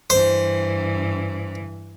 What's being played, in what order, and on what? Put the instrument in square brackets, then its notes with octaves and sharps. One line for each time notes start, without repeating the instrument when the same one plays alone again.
[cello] G2 E3 [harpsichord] C5